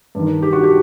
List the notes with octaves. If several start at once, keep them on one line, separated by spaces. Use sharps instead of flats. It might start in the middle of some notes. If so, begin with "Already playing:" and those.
G2 D#3
G4
F#4
G4